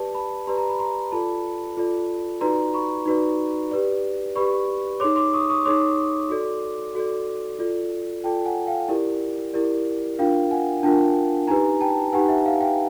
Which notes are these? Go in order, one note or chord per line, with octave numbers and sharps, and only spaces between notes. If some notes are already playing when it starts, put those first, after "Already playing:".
Already playing: G4 B4 D5 A5
A5 B5
G4 B4 D5 A#5 C6
A#5
B5
A#5 C6
F4 A4 D5 A5 B5
F4 A4 D5
D#4 F#4 B4 D5 A#5 C6
B5 C#6
D#4 F#4 B4 D5
G4 B4 D5
G4 B4 D5 B5 C#6
D#4 G#4 C#5 C6 D6
C6 D6
C#6 D#6
C#6 D#6
D#4 G#4 C#5 C6 D6
F#4 A4 D5
F#4 A4 D5
F4 A4 D5
F4 A4 D5 G5 A5
F#5 G#5
F5 G5
E4 G4 A#4 D5
E4 G4 A#4 D5
D4 F4 A#4 F5 G5
F#5 G#5
D4 F4 A#4 G5 A5
D#4 G4 B4 G#5 A#5
G5 A5
D#4 G4 B4 F#5 G#5
E5 F#5
F5
F5 G5